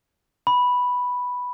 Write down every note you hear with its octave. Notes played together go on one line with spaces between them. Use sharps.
B5